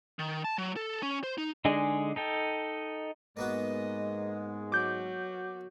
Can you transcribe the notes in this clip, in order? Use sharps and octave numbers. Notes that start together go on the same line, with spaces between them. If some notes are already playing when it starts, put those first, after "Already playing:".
D#3
A5
F#3
A4
C#4
C5
D#4
D3 G#3 D4 D#4 G#4
D#4 A4 G5
G#2 G#3 A#3 B3 F#4 D#5
F#3 D6 G6